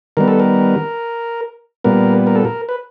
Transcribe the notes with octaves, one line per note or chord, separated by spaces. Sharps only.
D#3 G3 B3 A#4
A4
A#4
A#2 G3 B3 A#4
A#4
A4
A#4
B4